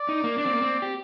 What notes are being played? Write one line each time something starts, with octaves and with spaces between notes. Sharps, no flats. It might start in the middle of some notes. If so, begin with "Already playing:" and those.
Already playing: D5
D#4
A#3
D4 D5
C4
A#3
C4
G4